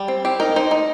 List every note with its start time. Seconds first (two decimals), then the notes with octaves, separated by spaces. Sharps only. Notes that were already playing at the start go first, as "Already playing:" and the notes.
Already playing: G3
0.08 C4
0.25 C4 G4
0.40 D#4 A#4
0.56 D#4 C5
0.71 D#4